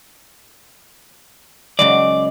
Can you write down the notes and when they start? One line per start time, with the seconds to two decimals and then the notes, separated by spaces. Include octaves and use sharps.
1.79 C#3 F#3 G#3 D5